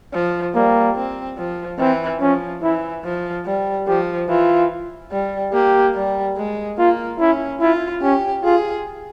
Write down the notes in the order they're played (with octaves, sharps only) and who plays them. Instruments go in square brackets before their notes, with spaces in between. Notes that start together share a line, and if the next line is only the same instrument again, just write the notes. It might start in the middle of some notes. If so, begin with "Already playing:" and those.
[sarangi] F3
[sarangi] G3 [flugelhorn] A#3
[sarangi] C4
F3
[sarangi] E3 [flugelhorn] C4
[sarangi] F3 [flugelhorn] C#4
[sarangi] E3 [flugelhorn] E4
[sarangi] F3
G3
[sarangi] F3 [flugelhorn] G4
[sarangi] E3 [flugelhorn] F4
[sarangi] G3
[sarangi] A#3 [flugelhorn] G4
[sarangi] G3
G#3
[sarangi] A#3 [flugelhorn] F4
[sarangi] C#4 [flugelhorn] E4
[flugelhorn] E4 [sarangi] F4
[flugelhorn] C#4 [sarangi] G4
[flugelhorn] F4 [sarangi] G#4